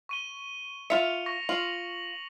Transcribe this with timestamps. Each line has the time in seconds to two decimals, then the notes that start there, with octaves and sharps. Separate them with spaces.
0.09 C#6 D#7 G7
0.90 F4 E5 C#7 F7
1.26 C#6 A#6
1.49 F4 F#7